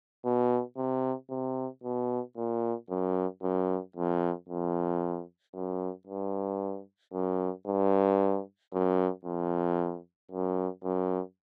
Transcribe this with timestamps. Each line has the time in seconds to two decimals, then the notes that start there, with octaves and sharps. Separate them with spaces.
0.25 B2
0.77 C3
1.30 C3
1.83 B2
2.37 A#2
2.89 F#2
3.43 F#2
3.96 F2
4.48 F2
5.54 F#2
6.07 G2
7.13 F#2
7.67 G2
8.73 F#2
9.25 F2
10.31 F#2
10.84 F#2